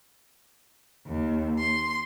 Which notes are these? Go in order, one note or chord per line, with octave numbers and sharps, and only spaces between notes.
D#2
C6